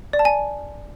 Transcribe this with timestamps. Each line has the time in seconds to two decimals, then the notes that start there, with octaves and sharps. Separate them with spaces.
0.13 D5
0.19 A5
0.25 G#5